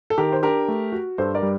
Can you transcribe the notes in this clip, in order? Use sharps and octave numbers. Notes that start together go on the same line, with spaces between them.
A4
D#3 G4 A#4
C5
D4 G4 A#4
A3
F#4
G2 A4 C5
A#4 D5
G3